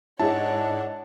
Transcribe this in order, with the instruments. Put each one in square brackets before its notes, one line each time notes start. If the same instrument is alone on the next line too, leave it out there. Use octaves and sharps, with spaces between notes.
[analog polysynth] G#2 D4 [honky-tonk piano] E4 G#4 D#5 [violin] C#5 F#5 [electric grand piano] A5